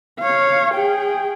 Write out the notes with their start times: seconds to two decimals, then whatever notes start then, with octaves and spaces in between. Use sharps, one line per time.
0.20 C#5 F5
0.74 G#4 G5